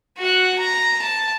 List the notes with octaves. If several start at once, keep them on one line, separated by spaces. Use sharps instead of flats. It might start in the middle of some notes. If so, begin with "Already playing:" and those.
F#4 F#5
A#5
A5